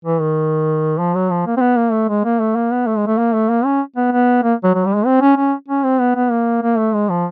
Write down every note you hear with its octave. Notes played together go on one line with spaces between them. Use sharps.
E3
D#3
F3
F#3
F3
A#3
C4
B3
A#3
A3
G#3
A#3
A3
A#3
B3
A3
G#3
A3
A#3
A3
A#3
C#4
B3
B3
A#3
F#3
F#3
G3
G#3
C4
C#4
C#4
C#4
C4
B3
B3
A#3
A#3
A3
G#3
F3